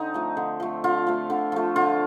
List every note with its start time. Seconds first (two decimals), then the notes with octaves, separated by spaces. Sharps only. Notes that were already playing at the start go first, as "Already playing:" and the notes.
Already playing: D3 C4 D#4
0.14 F3 A3
0.37 D3
0.60 F3 A3
0.84 D3 F4
1.07 F3 A3
1.30 D3
1.52 F3 A3
1.76 D3 F4